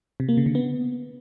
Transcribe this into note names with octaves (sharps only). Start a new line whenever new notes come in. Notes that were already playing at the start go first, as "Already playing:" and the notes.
C3
A#3
C#3
D3
B3